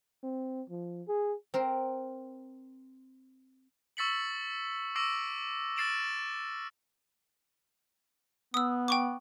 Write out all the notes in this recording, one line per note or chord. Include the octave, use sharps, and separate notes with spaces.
C4
F3
G#4
C4 A#4
C#6 E6 A6 B6 C#7 F#7
C#6 D6 E6 A#6 C7 D7
F6 A6 C7 D7 E7 F#7
B3 D#6 E6
G5 C#6 D6